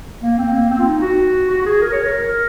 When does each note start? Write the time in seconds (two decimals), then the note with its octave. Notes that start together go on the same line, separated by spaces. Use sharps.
0.22 A#3
0.38 C4
0.53 A#3
0.70 C4
0.79 F4
0.86 D#4
1.01 F#4
1.49 F#4
1.61 F#4
1.66 G#4
1.82 A#4
1.92 C#5
2.03 A#4